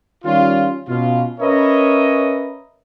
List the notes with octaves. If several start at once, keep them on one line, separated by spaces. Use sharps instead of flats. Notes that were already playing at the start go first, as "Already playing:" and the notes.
D#3 G3 C#4 F4
B2 C#4 F4
C#4 A#4 B4 C#5 D#5 E5